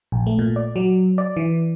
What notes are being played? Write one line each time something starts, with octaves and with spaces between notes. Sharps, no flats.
A#1
A3
A#2
D5
F#3
D5
E3